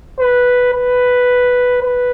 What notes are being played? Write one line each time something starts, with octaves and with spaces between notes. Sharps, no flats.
B4
B4
B4